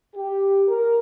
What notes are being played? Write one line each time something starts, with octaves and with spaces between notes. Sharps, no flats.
G4
A#4